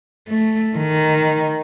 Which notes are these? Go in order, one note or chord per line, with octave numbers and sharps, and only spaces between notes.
A3
D#3